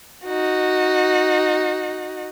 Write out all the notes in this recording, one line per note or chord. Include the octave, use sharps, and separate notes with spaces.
D#4 F#4